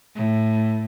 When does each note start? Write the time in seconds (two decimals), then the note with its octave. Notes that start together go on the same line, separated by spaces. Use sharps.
0.15 A2